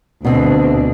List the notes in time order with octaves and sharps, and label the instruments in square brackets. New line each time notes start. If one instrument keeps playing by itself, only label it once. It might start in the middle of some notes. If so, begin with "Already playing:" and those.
[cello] D2 D4 [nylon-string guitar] B2 C4